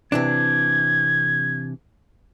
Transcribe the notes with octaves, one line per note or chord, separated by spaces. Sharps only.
C3 E3 D4 G#6